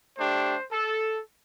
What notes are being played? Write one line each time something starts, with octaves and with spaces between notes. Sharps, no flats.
A3 D4 G4 C5
A4